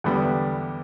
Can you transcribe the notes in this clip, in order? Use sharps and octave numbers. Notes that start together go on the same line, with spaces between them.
E2 D3 G3 B3